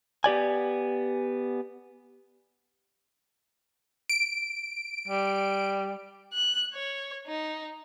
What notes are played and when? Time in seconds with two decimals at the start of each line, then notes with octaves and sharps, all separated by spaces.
0.24 B3 G4 D5 G#5
4.09 D7
5.08 G3
6.33 F#6
6.73 C#5
7.27 D#4